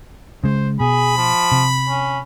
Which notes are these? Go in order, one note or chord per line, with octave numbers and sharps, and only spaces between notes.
C#3 G#3 C5
B2 G#4 B5
F3
C3
C#4